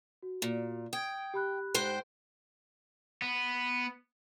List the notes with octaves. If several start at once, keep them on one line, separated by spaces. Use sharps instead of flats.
F#4
A#2
G5 D#6 G#6 D7
G4 B5 F#6
G#2 C5 G5
B3